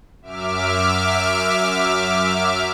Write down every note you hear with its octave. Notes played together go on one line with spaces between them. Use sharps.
F#2 E5 D6 F6